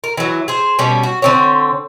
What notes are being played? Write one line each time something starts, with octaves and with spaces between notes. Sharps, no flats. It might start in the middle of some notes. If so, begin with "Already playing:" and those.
A#4
E3 F#3
G#4 C5
B2 G3 C#4
F#4
D3 C4 C#5